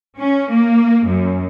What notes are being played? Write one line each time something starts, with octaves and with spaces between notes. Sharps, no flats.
C#4
A#3
F#2